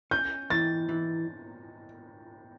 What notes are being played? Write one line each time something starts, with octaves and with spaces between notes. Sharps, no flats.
C#4 G6
E3 A6
E3